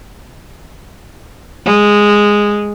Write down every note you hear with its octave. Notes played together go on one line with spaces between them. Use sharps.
G#3